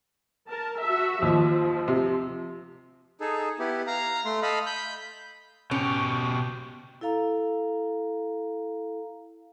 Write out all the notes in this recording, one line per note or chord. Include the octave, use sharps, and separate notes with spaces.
A#4 A5
F#4 E5
D#2 F3
C3
D#4 G#4 A4
B3 E4 G4
F5 A#5
A3 C6
A4 D#5 F5 B5
B5 G6
B2 C#4 G4
E4 A4 F5 A#5